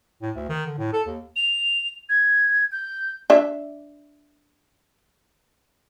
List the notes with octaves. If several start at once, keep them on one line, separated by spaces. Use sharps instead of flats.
A2
D2
D#3
D3
A2
A4
D#2
F7
G#6
G6
D4 E5